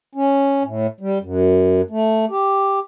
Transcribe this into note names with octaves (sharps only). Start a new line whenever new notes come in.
C#4
A2
G3
F#2
A3
G4